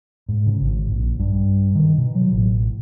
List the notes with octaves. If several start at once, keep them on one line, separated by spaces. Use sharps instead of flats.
G#2
C#3
G#1
A#1
G2
D#3
B2
F#3
A1